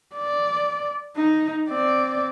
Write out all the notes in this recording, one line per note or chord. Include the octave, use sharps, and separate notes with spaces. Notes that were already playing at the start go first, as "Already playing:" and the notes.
D5
D#4
C4 D5